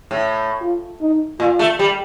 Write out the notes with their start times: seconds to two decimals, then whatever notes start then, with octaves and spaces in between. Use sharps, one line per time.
0.11 A2
0.61 F4
1.01 D#4
1.40 A#2 F4
1.59 A3
1.79 G3